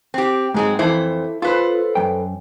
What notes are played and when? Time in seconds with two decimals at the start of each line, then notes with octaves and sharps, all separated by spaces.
0.14 C4 G4
0.54 G#2 F#3 G#3 C4
0.79 F2 E3 E4 A4 C5
1.42 F4 A4 B4 C5
1.95 F#2 G5